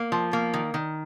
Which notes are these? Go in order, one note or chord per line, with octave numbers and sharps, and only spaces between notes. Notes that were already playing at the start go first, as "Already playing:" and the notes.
Already playing: A#3
F3
A#3
D#3
D#3